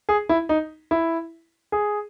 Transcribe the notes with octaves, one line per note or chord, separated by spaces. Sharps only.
G#4
E4
D#4
E4
G#4